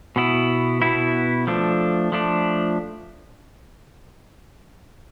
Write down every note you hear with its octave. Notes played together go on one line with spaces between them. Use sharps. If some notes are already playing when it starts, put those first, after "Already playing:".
B2 B3 E4
B2 B3 E4
F3 A3 D4
F3 A3 D4